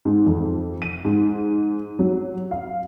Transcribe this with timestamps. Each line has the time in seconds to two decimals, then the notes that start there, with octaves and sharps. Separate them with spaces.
0.05 G#2
0.26 F2
0.82 D#7
1.05 G#2
1.99 F#3
2.51 F5